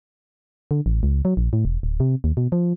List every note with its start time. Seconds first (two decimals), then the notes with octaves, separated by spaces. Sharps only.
0.71 D3
0.86 A1
1.03 C#2
1.25 F#3
1.37 A#1
1.53 A2
1.65 E1
1.83 D1
2.00 C3
2.24 D#2
2.37 B2
2.52 F3